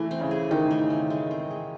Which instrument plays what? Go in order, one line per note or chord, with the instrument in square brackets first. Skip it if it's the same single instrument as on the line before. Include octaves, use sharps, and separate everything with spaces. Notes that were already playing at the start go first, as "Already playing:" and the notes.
Already playing: [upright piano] E3 [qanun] A3
[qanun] C4
[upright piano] C#3
[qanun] G#4
[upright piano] D#3 [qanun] D#4
[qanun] A3
C4
G#3
C4
G#3